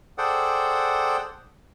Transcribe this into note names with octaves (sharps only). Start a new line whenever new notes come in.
G#4 A4 C5 D5 F#5 G5